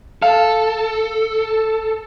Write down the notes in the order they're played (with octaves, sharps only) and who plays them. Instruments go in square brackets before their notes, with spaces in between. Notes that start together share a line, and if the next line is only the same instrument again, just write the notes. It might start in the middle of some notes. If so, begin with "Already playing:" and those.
[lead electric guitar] A4 [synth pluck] F5